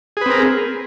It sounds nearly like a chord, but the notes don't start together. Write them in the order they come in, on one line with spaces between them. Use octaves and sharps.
G#4 B4 C4 A#4